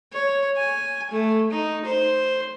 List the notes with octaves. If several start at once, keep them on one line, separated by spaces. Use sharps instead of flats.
C#5
G#5
A3
D#4
C5